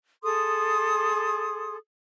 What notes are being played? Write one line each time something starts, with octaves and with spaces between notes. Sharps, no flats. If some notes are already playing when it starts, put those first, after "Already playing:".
G#4 A4 C6 D#6